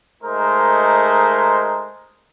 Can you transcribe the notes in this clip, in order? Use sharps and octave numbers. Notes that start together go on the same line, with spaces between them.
G#3 A3 D#4 A#4 C5